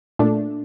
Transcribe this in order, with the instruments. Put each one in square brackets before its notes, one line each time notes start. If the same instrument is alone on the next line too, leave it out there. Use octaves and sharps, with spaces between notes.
[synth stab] A#2 A3 D4